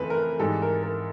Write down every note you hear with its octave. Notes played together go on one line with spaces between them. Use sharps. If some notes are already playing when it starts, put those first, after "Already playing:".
Already playing: F2 C#3 E3 A3 C4 B4
A#4
G#2 E3 G3 A4
A#4
A#4